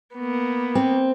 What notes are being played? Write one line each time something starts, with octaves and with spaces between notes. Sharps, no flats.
A#3 B3
C4